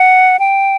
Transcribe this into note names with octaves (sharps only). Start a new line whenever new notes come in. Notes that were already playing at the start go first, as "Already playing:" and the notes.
Already playing: F#5
G5